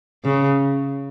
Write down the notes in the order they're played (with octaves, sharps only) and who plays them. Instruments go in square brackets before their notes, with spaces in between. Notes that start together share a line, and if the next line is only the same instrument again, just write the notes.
[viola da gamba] C#3